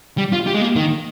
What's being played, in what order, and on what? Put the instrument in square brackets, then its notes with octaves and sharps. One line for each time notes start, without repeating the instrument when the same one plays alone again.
[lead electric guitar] G3
F4
G4
G#3
A#3
D#3